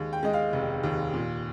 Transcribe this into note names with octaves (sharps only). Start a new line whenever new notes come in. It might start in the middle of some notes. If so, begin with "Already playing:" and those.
Already playing: D#2 G#3
G5
G#3 D#5
F5
F1
D#2
A#2